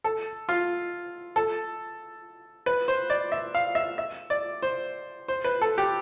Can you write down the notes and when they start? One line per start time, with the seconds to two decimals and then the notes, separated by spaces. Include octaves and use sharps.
0.04 A4
0.49 F4
1.36 A4
2.66 B4
2.88 C5
3.10 D5
3.32 E5
3.55 F5
3.75 E5
3.98 E5
4.30 D5
4.62 C5
5.28 C5
5.44 B4
5.62 A4
5.78 G4